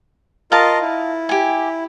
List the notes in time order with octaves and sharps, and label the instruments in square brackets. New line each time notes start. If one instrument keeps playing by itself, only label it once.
[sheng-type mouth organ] F4 A#4 D#5 [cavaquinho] F5 A5
[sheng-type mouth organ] E4
[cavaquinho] G4 G#5